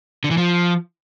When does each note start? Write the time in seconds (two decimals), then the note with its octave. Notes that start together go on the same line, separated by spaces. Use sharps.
0.24 D3
0.31 E3
0.37 F3